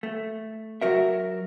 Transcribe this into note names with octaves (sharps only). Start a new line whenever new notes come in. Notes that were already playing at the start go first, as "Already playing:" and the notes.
A3
F#3 F#4 A#4 E5